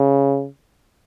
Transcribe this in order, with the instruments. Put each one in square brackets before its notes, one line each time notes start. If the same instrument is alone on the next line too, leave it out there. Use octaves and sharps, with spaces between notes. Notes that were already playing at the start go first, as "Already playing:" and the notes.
Already playing: [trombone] C#3